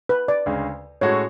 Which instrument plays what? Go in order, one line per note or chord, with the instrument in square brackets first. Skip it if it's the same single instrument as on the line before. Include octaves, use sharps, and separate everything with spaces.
[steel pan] B4
D5
[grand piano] D2 C#3 G#3
[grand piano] A2 G#3 C#4 F#4 A4 [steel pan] C#5